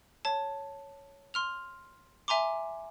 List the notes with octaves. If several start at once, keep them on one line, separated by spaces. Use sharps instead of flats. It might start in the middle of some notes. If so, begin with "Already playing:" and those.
C#5 A5
C6 F6 F7
E5 G#5 A#5 C6 D6